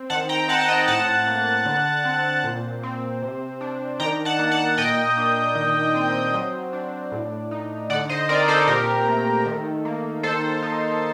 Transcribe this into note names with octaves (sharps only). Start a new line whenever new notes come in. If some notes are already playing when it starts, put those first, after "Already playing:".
Already playing: C4
D#3 F#5 A5
G5 A#5
C4 F#5 A5
A5
D#5 G5
A2 F#5 A5
A#3
D3
C4
A#2
C4
C3
D4
D#3 G5 A#5
F#5 A5
A#3
F#5 A5
A#2 D#5 G5
D4
D#3
C4
F#3
D4
A2
D#4
D3 D5 F#5
C5 D#5
C4 A#4 D5
A4 C5
A#2 G4 A#4
A3
D#3
A#3
D#3 A4 C5
D#4